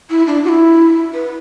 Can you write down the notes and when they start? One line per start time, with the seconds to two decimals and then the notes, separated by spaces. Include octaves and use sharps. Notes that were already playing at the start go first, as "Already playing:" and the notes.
0.10 E4
0.27 D4
0.44 F#4
0.48 E4
1.14 B4